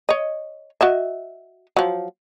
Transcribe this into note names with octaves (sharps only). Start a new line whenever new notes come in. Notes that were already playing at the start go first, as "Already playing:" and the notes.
C#5 D#5
F#4 D#5 E5
F3 F#3